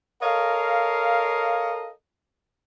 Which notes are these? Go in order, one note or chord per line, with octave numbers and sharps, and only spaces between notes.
A4 A#4 C#5 D#5 F5